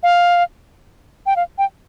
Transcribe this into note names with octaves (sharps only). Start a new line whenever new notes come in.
F5
G5
F5
G5